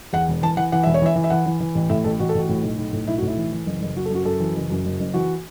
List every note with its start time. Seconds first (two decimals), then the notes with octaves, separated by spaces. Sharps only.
0.13 E2 F#5
0.28 E1
0.42 E3 A5
0.57 E3 F#5
0.72 E3 F#5
0.83 E1 E5
0.94 C#5
1.02 E3 E5
1.16 E3
1.24 E5
1.30 E3 F#5
1.46 E3
1.60 E3
1.75 A1
1.90 A2 E5
2.04 A1 A4
2.19 A1 F#4
2.29 A4
2.35 A1 F#4
2.49 A2
2.63 B1
2.78 B1
2.93 A2
3.07 B1 E4
3.18 F#4
3.22 A2 E4
3.37 E3
3.52 E3
3.66 F#1
3.81 F#1
3.96 F#1 F#4
4.05 A4
4.10 F#2 F#4
4.25 F#2 A4
4.40 E3
4.55 F#1
4.70 F#2
4.85 F#1
5.00 F#1
5.14 E3 F#4